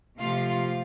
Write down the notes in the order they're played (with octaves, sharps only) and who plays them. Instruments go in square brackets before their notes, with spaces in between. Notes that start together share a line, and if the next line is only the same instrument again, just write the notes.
[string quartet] C3 F3 A3 F4 F5